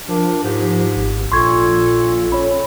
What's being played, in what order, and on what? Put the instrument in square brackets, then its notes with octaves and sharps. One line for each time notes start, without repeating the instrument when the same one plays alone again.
[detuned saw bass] F3 [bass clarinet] D4 [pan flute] A#4
[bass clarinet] G#2 [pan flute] G4
[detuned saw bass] G#1
[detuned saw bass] A#1 [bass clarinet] A#2 [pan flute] A4 [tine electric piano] C6 C#6 G#6
[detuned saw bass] C#4 [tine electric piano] C#5 B5